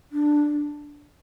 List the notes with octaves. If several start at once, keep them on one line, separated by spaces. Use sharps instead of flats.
D4